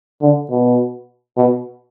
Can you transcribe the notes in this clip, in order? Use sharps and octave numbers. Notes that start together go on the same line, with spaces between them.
D3
B2
B2